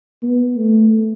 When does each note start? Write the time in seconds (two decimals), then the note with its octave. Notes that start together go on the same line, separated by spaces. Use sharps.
0.23 B3
0.57 A3